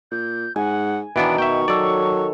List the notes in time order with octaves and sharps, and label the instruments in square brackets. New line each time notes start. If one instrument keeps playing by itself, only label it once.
[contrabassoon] A#2 [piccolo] G6
[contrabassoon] G#2 [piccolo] F#5 [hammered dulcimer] G#5
[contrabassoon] B2 [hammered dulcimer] D#3 [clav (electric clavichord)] E3 B3 D4 [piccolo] D7
[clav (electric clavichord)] E5 G5 [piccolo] C#6
[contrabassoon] F#3 [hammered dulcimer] A4 C#5 [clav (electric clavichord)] D5